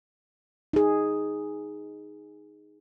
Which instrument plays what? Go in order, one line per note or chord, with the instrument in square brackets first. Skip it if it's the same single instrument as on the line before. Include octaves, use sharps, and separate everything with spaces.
[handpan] D#4 G#4